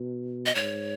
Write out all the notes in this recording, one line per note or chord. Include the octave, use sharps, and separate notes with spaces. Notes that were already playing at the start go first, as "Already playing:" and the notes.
Already playing: B2
D#5
G#2 C#5